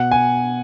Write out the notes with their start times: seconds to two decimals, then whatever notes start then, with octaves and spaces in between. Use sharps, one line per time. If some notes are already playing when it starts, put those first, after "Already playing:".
Already playing: B2 F#5
0.11 G#5